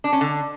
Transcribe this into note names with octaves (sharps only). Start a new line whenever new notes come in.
D4
C#4
D3